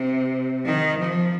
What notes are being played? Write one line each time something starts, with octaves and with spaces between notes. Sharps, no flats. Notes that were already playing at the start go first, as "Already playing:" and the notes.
Already playing: C3
D#3
F3